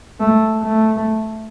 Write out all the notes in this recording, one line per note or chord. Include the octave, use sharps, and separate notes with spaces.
A3
A3